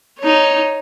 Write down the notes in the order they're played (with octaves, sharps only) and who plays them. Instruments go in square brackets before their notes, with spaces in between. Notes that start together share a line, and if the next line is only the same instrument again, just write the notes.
[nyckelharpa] D#4 C#5